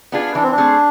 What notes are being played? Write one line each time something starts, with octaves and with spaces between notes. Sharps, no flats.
B3 D4 F4 G#4
E3 D4
C4
D4
A3 C4 G#4